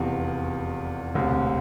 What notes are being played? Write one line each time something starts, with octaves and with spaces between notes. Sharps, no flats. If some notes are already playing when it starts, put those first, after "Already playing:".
Already playing: F1 E2 C3
E1 D2 C3